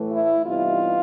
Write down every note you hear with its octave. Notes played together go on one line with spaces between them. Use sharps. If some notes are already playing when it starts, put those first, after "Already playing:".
Already playing: A2 E3 A3
E4
C3 E3 G3 B3 D#4 F4